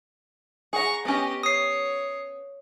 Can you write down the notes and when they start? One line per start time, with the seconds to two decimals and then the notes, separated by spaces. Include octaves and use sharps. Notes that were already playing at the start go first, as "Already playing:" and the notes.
0.73 G#4 F#5 A#5 C#6
1.05 B3 C#4 G4 D#5
1.43 C#5 D#6 C7